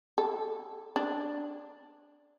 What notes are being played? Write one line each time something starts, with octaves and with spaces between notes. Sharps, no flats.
A4
D4